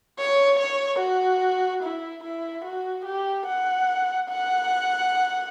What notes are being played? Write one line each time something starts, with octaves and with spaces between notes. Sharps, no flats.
C#5
C#5
F#4
E4
E4
F#4
G4
F#5
F#5